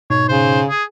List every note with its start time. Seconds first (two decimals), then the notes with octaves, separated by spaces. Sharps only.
0.10 G#2 B2 D#4 C#5
0.29 C#3 C5
0.69 G#4